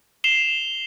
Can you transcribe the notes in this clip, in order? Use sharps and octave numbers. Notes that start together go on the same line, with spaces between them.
C7 E7 F7 G7